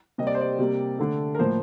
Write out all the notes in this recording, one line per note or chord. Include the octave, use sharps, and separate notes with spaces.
C3 G3 A#3 D#5
D5
C5
D5
C3 G3 A#3
D3 A3
A#4
A2 F3 A#3 C5